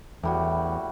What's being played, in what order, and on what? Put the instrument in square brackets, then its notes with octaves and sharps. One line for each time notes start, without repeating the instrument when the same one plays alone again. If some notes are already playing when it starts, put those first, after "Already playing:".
[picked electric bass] E2 [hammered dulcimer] A2 G3 F#4